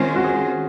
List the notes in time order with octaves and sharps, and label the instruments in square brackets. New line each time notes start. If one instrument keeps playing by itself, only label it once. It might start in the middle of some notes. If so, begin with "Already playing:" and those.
Already playing: [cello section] D#3 G#3 C4 F4 C5 [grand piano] C#4
[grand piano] F#4
G#4